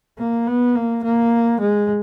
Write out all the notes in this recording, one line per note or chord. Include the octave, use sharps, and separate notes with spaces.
A#3
B3
A#3
A#3
G#3